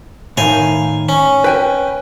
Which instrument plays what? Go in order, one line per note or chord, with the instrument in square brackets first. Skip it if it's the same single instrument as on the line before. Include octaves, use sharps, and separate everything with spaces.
[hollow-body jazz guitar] A2 D#3 [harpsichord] F5 G#5
[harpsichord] C#4
[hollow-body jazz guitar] B4 G5 G#5